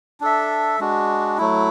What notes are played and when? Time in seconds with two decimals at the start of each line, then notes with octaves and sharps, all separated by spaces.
0.21 D4 A4 E5
0.80 G#3 D4 F#4
1.38 F#3 A3 E4